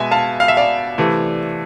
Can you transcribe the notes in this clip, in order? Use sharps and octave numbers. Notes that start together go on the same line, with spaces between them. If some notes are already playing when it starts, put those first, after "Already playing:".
Already playing: B2 G#3 E5 G#5
F5 A5
F5
E5
D5 F5
C3 E3 A3